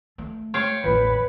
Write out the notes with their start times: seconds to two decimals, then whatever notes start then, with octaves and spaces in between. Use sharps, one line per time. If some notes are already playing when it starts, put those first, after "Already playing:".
0.18 A3
0.54 C#5 F5 G5
0.84 A1 E2 B4